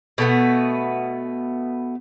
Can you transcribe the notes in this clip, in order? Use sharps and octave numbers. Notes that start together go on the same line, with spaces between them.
B2 A3 B3